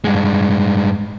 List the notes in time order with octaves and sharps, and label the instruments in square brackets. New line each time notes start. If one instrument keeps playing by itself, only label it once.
[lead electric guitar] G2 G#3